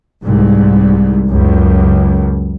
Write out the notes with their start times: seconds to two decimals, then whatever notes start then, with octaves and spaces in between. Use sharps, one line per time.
0.23 C2 G#2
1.27 C#2 F#2